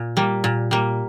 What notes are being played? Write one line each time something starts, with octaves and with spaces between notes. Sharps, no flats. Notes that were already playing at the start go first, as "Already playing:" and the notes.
Already playing: A#2
G3 A#3
A#2
G3 A#3